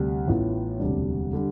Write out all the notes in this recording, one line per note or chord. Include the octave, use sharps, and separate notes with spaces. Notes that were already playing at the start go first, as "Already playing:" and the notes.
Already playing: D2 C3 G3 D4 G4
A1 A2 E3 B3 F4
E1 D2 C3 G3 D4
D3 G3